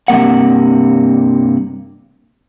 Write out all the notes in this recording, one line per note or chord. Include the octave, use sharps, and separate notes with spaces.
G2 C3 A#3 F#5